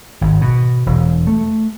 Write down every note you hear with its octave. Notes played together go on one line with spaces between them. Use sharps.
G#1
B2
E1
A3